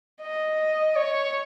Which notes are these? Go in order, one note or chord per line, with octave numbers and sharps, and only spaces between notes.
D#5
C#5